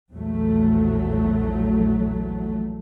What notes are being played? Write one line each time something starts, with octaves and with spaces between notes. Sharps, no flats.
A#1 E2 F#3 A3